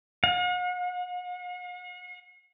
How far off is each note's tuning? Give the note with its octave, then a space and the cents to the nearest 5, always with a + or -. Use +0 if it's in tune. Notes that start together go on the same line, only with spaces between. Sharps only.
F#5 -45